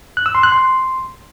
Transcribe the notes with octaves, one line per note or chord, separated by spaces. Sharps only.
F#6
E6
C6
F#6
C6